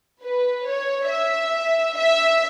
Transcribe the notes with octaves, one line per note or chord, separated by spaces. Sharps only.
B4
C#5
E5
E5